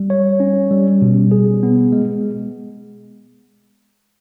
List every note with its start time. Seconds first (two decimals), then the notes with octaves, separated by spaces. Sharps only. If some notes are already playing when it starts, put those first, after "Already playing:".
Already playing: G3
0.10 C#5
0.40 C#4
0.71 G3
1.02 B2
1.31 G#4
1.63 B3
1.92 G#3